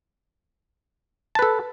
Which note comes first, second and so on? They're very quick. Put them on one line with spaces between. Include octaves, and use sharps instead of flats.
A5 B4 A4